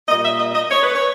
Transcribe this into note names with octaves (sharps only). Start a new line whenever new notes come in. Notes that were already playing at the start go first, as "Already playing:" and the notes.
A#2 G3 A#3 D#5
E5
D#5
D#5
C#5
B4
C#5